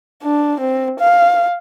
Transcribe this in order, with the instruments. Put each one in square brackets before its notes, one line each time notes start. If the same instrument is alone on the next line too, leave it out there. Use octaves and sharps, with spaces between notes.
[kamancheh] D4
C4
F5